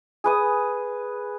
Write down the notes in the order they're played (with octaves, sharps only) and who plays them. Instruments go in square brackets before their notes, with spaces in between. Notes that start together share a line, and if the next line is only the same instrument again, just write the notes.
[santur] G#4 B4 D#6